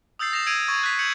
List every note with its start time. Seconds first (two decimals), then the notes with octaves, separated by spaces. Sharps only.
0.19 D#6 E6 G6 A6 C7
0.33 D#6 A#6 C7 E7 F7
0.46 D#6 E6 G#6 A#6 D7 D#7
0.68 C#6 G#6 A6
0.83 F#6 B6
0.99 G6 G#6 C#7 F#7